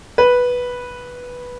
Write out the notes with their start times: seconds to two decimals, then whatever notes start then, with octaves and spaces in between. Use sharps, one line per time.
0.18 B4